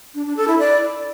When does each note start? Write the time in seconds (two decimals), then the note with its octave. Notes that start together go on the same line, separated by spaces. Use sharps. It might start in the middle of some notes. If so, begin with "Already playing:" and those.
0.15 D4
0.26 D4
0.37 A4
0.48 E4
0.59 D5